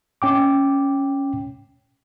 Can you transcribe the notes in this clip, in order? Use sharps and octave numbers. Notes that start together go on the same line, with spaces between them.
C#4 G5 D6